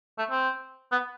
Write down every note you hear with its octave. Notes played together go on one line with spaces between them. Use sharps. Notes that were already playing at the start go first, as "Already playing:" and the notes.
A3
C4
B3